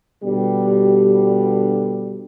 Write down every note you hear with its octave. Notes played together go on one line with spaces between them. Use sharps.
B2 D3 G3